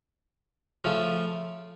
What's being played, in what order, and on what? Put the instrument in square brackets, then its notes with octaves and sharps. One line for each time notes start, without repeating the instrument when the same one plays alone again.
[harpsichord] C#3 F3 A3 F4